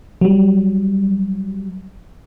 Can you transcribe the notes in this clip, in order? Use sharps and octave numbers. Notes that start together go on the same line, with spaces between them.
F#3 G3